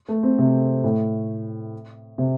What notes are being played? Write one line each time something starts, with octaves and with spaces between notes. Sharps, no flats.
A3
C4
C3
A2
C3